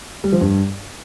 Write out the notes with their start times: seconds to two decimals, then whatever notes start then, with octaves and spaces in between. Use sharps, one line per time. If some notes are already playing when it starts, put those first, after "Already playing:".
0.24 G3
0.32 F3
0.41 G2